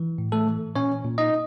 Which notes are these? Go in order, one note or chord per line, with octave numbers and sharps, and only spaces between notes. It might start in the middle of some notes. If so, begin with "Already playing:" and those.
Already playing: E3
A2
A3 A4
E3
A#2 C#4 C#5
A#2
D#4 D#5